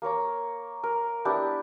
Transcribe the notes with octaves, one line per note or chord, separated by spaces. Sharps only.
A#3 A#4 C#5 A#5
A#4
B3 D4 E4 G4